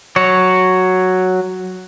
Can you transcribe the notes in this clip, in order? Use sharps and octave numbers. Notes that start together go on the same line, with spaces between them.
F#3 C#5